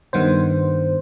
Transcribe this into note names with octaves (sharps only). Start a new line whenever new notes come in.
G2 D#3 B3 C5